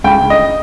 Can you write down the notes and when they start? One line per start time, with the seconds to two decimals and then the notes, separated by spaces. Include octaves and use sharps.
0.04 C#2 G5
0.22 C#2
0.30 D#5